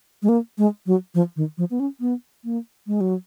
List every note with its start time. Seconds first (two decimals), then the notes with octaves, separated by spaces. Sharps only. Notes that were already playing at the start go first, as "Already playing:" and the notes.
0.23 G#3
0.29 A#3
0.58 G#3
0.86 F#3
1.15 F3
1.36 D#3
1.58 F3
1.71 B3
1.80 C#4
2.01 B3
2.44 A#3
2.87 G#3
3.01 F#3